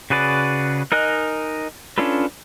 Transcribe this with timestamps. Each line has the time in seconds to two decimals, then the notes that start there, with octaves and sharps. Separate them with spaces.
0.10 C#3 F#4 G#4 B4 D5
0.92 D#4 A#4 D#5 G#5 F#6
1.98 C#4 D4 F4 A4 B4